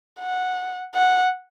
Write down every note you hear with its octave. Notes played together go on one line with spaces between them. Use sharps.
F#5
F#5